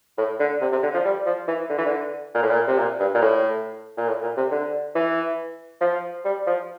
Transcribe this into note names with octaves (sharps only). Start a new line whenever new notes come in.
A2
D3
C3
C3
D3
F3
G3
F3
E3
D3
E3
D3
A#2
A2
A#2
C3
A#2
G2
A#2
A2
A#2
A2
A#2
C3
D3
E3
F3
G3
F3